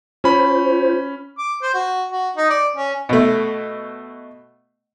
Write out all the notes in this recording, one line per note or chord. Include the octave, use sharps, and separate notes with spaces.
C#4 F4 C5 B5
D6
C5
F#4
F#4
D#4
D5
C#4
B2 A3